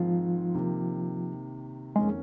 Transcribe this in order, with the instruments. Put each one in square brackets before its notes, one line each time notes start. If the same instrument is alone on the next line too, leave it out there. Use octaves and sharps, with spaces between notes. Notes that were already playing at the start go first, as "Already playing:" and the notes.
Already playing: [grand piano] G#2 D#3 G#3 C4 [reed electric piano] F3 F4
[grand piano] C3 D#3 A#3
[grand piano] F2 D#3 A#3 C#4 [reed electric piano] G#3 G#4